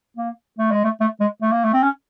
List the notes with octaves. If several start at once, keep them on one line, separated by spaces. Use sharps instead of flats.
A#3
A3
G#3
A3
A3
G#3
A3
A#3
A3
C4
C#4